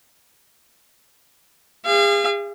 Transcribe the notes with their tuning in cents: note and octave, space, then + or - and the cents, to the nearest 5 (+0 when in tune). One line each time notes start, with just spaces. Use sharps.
G#4 -35 F5 -35